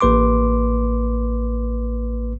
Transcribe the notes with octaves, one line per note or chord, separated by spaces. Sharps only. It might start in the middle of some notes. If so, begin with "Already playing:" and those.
A1 A#3 B4 C6 D6